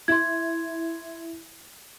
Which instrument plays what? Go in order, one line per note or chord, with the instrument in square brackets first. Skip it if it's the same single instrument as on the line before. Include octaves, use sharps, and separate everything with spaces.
[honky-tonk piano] E4 [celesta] C6 G#6